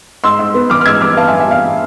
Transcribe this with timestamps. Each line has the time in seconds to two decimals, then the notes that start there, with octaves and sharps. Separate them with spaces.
0.24 G#2 C6 E6
0.39 G#2
0.54 B3
0.70 E3 D6 F6
0.81 F6
0.86 G#2 E6 G#6
1.01 E3 D6 F6
1.16 B3 F5 A5
1.28 E5 G#5
1.33 E3
1.40 E5 G#5
1.48 E3 F5
1.63 E5